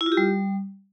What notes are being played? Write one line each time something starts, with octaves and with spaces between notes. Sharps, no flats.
E4
F4
G4
G3